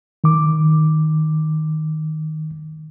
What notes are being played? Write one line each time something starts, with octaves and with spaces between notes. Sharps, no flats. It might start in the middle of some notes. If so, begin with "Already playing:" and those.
D#3 D6